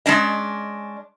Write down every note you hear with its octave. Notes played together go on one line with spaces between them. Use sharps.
G#3 C#4 D4 D#5